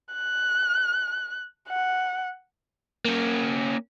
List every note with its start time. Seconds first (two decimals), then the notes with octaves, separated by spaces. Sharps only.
0.13 F#6
1.70 F#5
3.05 A#3 C#4